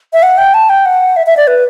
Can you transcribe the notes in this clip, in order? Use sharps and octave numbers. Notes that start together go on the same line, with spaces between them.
E5
F#5
G5
A5
G5
F#5
E5
E5
D5
B4